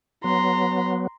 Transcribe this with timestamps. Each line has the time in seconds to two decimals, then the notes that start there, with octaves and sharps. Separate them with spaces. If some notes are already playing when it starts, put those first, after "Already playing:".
0.24 F#3 B3 A#5 C6